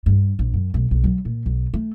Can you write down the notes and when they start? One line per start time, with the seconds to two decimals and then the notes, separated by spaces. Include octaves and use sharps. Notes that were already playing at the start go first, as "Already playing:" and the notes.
0.06 G2
0.39 A#1
0.53 F#2
0.74 B1
0.91 B1
1.04 F#3
1.25 A#2
1.46 B1
1.74 A3